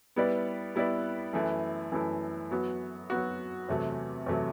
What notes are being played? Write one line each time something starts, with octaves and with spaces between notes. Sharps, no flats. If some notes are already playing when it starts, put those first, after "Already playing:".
G3 B3 E4 B4 D5
G3 B3 E4 B4 D5
F#2 E3 A3 E4
F#2 E3 A3 E4
F#3 B3 F#4
F#3 B3 F#4
E2 C3 F#3 A3
E2 C3 F#3 A3